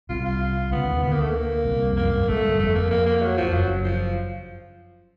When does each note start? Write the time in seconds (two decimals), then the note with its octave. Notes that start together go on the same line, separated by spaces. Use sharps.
0.09 C2 C3 F4
0.25 F4
0.71 C#2 C#3 B3
0.87 D#2 D#3
1.02 D2 D3 B3
1.12 A#3
1.21 A3
1.29 A#3
1.65 C2 C3
1.90 F2
1.96 A#3
2.02 F#2
2.15 G2
2.28 G#1 G#2 A3
2.43 G1 G2
2.59 F2 A3
2.75 F2 A#3
2.90 A#3
3.06 A#3
3.22 F#3
3.37 F2 F3
3.53 F#1 F#2 F#3
3.84 F3